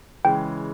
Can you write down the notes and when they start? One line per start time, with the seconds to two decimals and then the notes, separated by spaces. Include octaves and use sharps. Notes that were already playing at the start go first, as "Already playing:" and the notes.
0.25 C#3 E3 G#3 G5